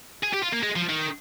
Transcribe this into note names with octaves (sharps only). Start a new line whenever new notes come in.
G#4
G4
F4
A#3
G#3
F3
D#3